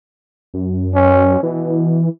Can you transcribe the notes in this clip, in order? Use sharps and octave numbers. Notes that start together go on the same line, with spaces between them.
F#2
C#4
B2 E3